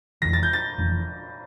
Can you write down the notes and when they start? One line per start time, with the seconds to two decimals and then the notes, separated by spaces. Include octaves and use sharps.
0.22 F1 F2 E3 A#6
0.33 A6
0.43 G6
0.53 A6
0.78 F1 F2 E3